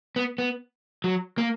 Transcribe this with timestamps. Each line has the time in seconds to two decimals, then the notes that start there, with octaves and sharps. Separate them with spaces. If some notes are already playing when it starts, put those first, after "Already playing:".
0.16 B3
0.38 B3
1.04 F#3
1.38 A#3